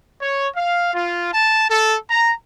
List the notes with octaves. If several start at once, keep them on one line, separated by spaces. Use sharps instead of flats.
C#5
F5
F4
A5
A4
A#5